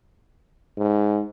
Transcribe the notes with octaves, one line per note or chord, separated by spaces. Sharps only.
G#2